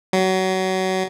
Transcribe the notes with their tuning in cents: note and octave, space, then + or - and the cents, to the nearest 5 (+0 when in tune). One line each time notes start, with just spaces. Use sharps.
F#3 +25